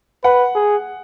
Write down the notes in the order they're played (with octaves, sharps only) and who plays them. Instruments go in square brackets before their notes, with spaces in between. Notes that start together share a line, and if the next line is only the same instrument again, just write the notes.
[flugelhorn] B4 [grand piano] F#5
[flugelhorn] G#4